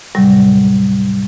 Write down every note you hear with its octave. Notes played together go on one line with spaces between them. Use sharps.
D#2 A2 C3 F#3 G3